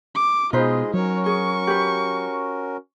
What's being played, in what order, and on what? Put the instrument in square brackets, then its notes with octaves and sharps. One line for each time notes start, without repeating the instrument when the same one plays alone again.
[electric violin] D6
[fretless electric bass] B2 [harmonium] G#3 G#4 D#5 [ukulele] D#4 B4 C5 [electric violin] F4
[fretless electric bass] F#3 [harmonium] C#4 F#4 A#4 [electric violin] C#5
[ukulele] G#4 [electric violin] C#6
[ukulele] G4 B4